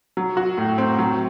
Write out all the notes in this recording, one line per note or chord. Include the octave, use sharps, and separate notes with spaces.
F#3
F#4
A2
C4
F#3